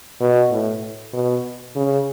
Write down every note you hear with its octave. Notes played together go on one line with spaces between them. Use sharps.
B2
A2
B2
C#3